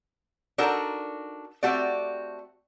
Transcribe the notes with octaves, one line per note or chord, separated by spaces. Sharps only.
D4 D#4 F#4 A4 A#4
A3 C4 F#4 G4 D5